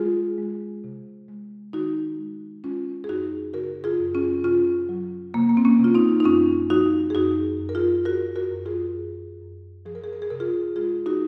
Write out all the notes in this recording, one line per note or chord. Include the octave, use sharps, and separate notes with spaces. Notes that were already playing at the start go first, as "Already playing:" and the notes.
Already playing: G#3 F4 G#4
G#3
C3
G#3
D#3 D#4 F#4
G#3
G#3 C#4 F4
G#4
F#2 D#4 F#4
C#3 F#4 A#4
F4 G#4
F#2
C#4 F4
C3 C#4 F4
F#3
C3 A#3
A#3
C4
A#3 C#4
C3
F4
C4 D#4
D#4
F#2 C#4 F4
F3 D#4 F#4
G#4
F#2 D#4 F#4
F#2
A#4
F4 G#4
F#2 F#4 A#4
F#4 A#4
F#2
F4 G#4
F#2
F#2
F3 G#4
A#4
G#4
A#4
G#4
C3 A#4
F4 G#4
G#3 F4 G#4
D#4 F#4